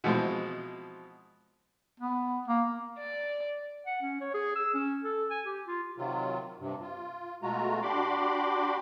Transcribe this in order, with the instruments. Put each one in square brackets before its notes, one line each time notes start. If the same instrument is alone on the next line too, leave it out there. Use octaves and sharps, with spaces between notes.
[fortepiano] B2 E3 F3 G#3 C4
[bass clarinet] B3
A#3
[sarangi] D5
[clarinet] F#5
C#4
C#5
G#4
E6
C#4
A4
G#5
G4
F4
[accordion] C3 D#3 F#3 F4
G2 C3
F4
B2 G#3 A3 F4 F#4 A#5
D4 F#4 G4 B5 C6 D6